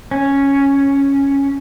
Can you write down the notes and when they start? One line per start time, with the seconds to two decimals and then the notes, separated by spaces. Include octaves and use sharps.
0.11 C#4